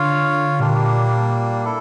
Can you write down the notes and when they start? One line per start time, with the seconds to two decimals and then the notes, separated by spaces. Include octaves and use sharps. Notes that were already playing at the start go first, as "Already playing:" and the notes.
Already playing: D3 F4 C#5 F5
0.59 A#2 G3 A#3 D4
1.65 E4 A4